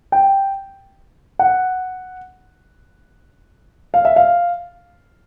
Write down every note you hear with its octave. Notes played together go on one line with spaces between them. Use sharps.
G5
F#5
F5
E5
F5